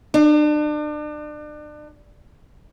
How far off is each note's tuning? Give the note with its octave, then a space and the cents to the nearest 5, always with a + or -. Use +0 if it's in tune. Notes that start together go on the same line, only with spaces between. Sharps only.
D4 +35